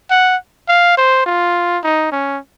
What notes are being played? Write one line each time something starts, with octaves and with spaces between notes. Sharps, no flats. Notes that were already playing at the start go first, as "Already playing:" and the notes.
F#5
F5
C5
F4
D#4
C#4